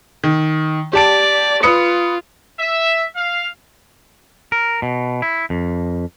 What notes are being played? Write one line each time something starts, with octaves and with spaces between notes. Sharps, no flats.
D#3
G4 D5 A5 D7
F4 B4 D#6 C#7
E5
F5
A#4
B2
E4
F2